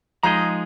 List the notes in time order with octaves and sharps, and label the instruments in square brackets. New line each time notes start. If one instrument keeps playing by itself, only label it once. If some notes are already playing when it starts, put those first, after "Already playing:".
[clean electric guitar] F3 G#3 D#4 G#4 D#5 [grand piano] A#5